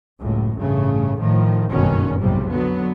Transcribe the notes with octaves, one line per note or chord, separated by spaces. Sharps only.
F#1 C#2 A2
A1 G2 C#3 A3
A2 D#3 F3
F#1 B1 G2 B2 D#3 C#4
B1 F2 G#2 C3 G3
D3 F#3 B3